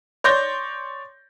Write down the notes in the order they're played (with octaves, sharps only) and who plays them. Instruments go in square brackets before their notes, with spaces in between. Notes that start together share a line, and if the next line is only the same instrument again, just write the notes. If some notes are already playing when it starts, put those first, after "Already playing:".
[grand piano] C#5 D5 C6 C#6 G6 A#6